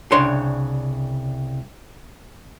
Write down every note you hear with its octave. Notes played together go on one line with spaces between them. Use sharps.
C2 C#3 D4 C#5 C6